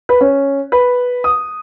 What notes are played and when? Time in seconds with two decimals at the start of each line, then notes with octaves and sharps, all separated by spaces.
0.09 B4
0.21 C#4
0.72 B4
1.24 D#6